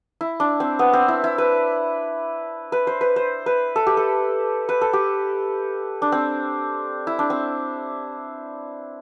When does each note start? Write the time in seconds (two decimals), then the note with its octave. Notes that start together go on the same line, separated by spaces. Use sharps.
0.21 E4
0.40 D4
0.60 C4
0.79 B3
0.94 C4
1.08 E4
1.24 E4
1.38 B4
2.72 B4
2.87 C5
3.01 B4
3.16 C5
3.46 B4
3.76 A4
3.87 G4
3.97 A4
4.69 B4
4.81 A4
4.93 G4
6.02 D4
6.12 C4
7.07 E4
7.19 D4
7.30 C4